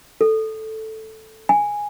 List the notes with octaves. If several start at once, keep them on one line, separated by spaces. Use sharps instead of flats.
A4
G#5